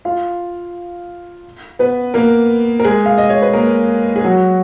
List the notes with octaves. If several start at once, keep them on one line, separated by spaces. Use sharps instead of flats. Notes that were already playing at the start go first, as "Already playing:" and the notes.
F4 F5
B3 B4
A#3 A#4
A#4
G#3 G#4
F5
D#5
C#5
B4
A#3 A#4
G#4
F#3 F#4